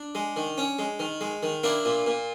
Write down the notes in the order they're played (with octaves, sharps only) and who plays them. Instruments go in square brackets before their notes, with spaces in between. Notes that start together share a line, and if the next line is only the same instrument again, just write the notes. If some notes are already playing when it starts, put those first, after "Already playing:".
Already playing: [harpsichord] D4
G#3
D#3
C#4
G#3
D#3
G#3
D#3
A#3 D4 E4
A#2
A#2